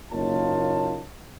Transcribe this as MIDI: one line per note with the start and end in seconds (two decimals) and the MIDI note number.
0.12 1.02 30
0.12 1.02 58
0.12 1.02 63
0.12 1.02 65
0.12 1.02 73
0.12 1.02 81